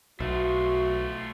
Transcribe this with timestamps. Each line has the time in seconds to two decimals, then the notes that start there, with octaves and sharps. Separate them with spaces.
0.20 B1 A3 F4 F#4